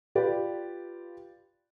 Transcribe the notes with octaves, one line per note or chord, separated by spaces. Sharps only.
F4 G4 B4 D5